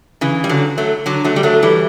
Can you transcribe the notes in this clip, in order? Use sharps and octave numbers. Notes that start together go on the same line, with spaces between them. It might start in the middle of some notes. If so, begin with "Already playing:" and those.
C#3 E3
G3
D3 F#3
F#3 A3
D3 F#3
F#3 A3
G3
F#3 A3
E3 G3